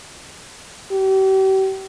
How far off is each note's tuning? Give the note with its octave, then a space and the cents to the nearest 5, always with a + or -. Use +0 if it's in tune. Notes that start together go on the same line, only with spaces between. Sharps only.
G4 -40